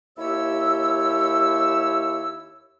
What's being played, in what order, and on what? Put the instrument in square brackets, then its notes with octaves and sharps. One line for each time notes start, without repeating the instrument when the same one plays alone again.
[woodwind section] D#2 E4 G4 C#5 E6